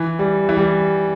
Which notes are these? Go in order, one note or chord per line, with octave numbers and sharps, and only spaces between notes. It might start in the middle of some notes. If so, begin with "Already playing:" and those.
Already playing: E3
G3
E3
G3